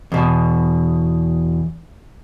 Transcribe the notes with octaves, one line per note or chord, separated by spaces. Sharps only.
E2 B2